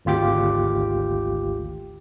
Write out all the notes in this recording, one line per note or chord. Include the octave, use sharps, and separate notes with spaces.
G#1 D2 F4 G4 D6